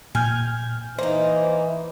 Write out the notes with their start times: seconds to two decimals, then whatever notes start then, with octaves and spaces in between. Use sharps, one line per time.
0.15 A#2 G#5 F6 G6
0.99 E3 A#3 D#4 C5